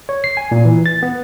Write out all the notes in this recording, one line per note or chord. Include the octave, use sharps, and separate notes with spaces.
C#5
C7
G#5
A#2
E3
A6
B3